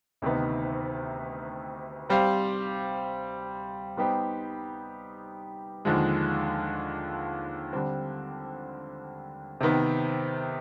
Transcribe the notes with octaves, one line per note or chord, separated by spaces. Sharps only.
D2 C3 D#3 B3 D#4
G3 C4 G4 C5 F5
G3 B3 D#4 G4 C5
D#2 D3 F3 G#3
D3 G3 C4
C3 D#3 B3